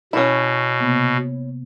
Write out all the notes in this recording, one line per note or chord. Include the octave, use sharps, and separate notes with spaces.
B2 C#4 E4
C3 A#3 B3